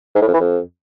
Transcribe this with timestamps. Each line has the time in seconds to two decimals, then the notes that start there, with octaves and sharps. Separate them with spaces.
0.15 G#2
0.21 A2
0.28 F2
0.34 E3
0.40 F2